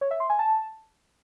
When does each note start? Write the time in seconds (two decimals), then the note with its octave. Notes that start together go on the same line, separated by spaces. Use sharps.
0.01 C#5
0.11 E5
0.20 C6
0.29 G#5
0.39 A5